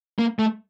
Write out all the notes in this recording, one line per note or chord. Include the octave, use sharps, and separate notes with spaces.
A#3
A3